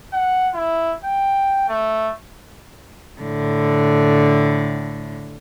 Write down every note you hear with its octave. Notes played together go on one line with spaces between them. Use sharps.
F#5
E4
G5
A3
A2 D3